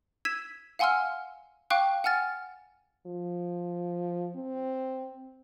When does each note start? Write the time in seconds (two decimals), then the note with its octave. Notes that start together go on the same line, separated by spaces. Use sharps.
0.25 E6 G#6 B6 D#7 E7
0.79 F5 F#5 G#5 C6 E6 F6
1.70 F5 G5 C#6 D6 F#6
2.04 F#5 G#5 F6 A6
3.06 F3
4.36 C4